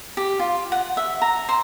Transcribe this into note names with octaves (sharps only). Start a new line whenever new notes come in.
G4
F4
F#5
E5
A#5
C5